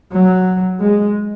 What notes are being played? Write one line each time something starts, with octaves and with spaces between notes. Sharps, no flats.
F#3
G#3